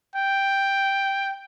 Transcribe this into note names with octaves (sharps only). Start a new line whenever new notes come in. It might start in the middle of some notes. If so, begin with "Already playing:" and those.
G5